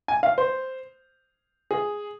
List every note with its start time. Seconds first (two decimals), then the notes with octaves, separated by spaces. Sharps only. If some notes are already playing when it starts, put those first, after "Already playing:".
0.08 G#5
0.23 F5
0.38 C5
1.71 G#4